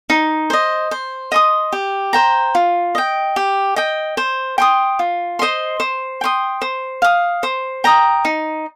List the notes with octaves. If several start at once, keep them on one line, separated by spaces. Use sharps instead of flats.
D#4
C5 D#5
C5
D#5 C6 D#6
G4
C5 G5 A#5
F4
D#5 G5
G4
D#5 G5
C5
G5 C6 D#6
F4
C5 D#5 C6
C5
G5 C6 D#6
C5
F5 D#6
C5
G5 A#5 D#6
D#4